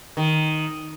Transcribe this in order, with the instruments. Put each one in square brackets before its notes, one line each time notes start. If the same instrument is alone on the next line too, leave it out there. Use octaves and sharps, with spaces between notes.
[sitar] D#3